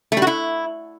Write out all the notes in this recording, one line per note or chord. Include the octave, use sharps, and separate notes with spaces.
A3
G3
F#4
E4